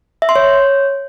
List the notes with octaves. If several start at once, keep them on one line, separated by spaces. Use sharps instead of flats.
E5
C6
C#5